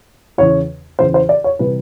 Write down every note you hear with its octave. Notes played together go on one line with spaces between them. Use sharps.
E2 C#3 E3 C#5
E2 C#3 E3 C5
C5
D5
C#5
C3 E3 G3 B4